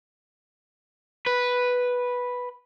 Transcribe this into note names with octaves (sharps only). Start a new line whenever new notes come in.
B4